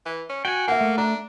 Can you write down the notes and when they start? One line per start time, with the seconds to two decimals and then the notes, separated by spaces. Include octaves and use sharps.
0.05 E3
0.29 C#4
0.45 F#4 G5 G#5
0.68 A#3 E5 F#5
0.81 A3
0.98 D4 A#5